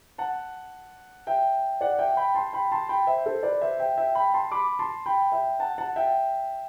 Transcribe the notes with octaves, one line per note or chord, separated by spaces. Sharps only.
F#5 A5
E5 G5
D5 F#5
E5 G5
G5 B5
A5 C6
G5 B5
A5 C6
G5 B5
C5 E5
A4 C5
B4 D5
C5 E5
E5 G5
E5 G5
G5 B5
A5 C6
B5 D6
A5 C6
G5 B5
E5 G5
F#5 A5
F#5 A5
E5 G5